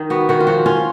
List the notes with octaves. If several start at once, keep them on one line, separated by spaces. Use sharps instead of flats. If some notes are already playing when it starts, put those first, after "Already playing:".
Already playing: D#3 D#4
B3 F#4
D#3 F#4
F4
F3 F#4
C#4 F4